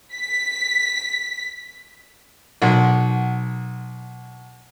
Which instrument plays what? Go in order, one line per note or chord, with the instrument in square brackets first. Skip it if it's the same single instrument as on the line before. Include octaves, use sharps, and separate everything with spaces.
[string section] B6
[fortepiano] B1 F#5